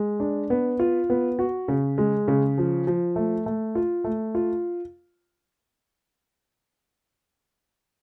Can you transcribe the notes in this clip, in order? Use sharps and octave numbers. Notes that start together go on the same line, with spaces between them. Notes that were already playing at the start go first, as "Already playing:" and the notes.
Already playing: G#3
D4
B3
F4
B3
F#4
C#3
G#3
C#3
F3
F3
A3
A3
F4
A3
F4